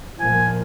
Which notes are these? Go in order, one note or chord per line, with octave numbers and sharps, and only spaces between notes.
A#2 F3 A#3 G#5